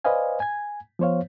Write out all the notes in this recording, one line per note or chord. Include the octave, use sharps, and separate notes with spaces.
B4 C5 D5 D#5 F5 G#5
G#5 G#6
F3 B3 C5 C#5 F5